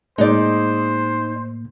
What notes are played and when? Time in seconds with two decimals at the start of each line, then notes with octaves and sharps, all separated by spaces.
0.18 A2 G#3 A#3 D#4 C5 D5